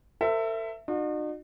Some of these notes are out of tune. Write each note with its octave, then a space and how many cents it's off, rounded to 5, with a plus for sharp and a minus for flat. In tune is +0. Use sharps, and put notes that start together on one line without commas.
A4 +45 C5 -40 E5 +10
D#4 -45 F#4 -40